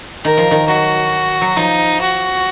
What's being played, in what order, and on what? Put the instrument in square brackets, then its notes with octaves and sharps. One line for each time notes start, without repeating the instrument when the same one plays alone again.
[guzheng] D#3 [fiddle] A#4
[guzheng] F3
D#3
[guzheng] F#3 [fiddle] F#4
[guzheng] F#3
[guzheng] F3 [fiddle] D#4
[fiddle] F#4